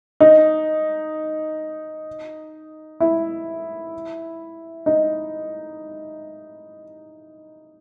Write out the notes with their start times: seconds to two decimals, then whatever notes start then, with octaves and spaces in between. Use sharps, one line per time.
0.20 D#4
3.00 E4
4.86 D#4